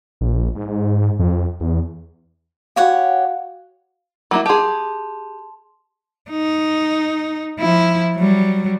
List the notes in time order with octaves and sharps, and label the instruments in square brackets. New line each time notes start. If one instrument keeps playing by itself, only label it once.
[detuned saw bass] A#1
G#2
F2
E2
[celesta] F#4 F5 [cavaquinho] G4 C#5 F#5
[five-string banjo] F#3 A#3 E4
[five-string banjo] G4 G#4 [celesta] A5 C6
[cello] D#4
F3 E4
F#3 G3